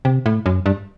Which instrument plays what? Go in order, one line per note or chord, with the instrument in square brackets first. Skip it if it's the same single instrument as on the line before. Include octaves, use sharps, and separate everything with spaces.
[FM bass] C3
A2
F#2
G2